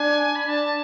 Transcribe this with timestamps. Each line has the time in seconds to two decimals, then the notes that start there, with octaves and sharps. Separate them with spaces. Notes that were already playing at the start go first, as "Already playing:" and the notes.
Already playing: D4 G#5
0.36 B5
0.47 D4 A5